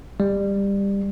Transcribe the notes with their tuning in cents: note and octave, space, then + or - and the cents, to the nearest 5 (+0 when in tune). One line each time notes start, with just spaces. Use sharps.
G3 +20